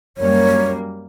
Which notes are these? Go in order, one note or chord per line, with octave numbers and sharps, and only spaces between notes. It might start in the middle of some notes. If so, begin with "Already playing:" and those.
F#2 G3 A#3 C#5